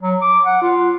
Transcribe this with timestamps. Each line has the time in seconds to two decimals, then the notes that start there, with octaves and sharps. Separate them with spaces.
0.03 F#3
0.21 D6
0.45 F#5
0.62 F4